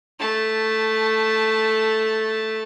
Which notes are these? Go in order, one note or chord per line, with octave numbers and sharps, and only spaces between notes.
A3 A5